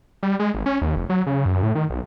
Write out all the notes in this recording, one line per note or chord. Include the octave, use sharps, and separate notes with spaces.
G3
G#3
G#1
C#4
D#2
F1
F#3
C#3
F#2
A2
D#3
B1